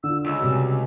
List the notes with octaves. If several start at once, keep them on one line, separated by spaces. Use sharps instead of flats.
D3 F4 E6
C#2 E6
C3 G3 F#4